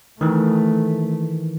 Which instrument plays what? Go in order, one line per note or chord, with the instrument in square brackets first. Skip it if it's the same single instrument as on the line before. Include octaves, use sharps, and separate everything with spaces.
[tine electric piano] D#3 E3 [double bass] A3